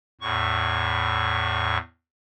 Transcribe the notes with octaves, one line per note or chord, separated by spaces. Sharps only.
E2 A2 C#6